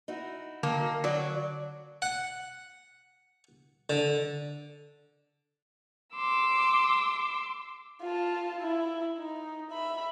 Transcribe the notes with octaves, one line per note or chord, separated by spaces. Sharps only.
D#4 E4 F#4
D3 A#3
F#3 F#4 D5
F#5
D3
C6 D6 E6
F4 A5
E4
D#4
E5 B5